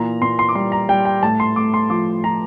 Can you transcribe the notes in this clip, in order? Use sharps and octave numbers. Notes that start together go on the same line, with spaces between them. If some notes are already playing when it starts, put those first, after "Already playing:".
Already playing: A#2 E3 A#5
A#2 C6
C6
D6
G3 C6
A#5
G3 G5
G5
A2 A5
C6
A2 D6
C6
F3 D6
F3 A#5